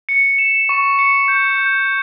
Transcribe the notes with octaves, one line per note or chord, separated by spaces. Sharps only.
C#7
E7
C#6
C#7
G6
G6